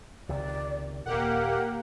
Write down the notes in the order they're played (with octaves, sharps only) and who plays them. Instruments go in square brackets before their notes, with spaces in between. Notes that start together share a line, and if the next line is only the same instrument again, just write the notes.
[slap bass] C#2 C3 D#3 [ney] D5
[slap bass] D#1 [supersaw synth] A#3 G4 F#5 [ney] A#4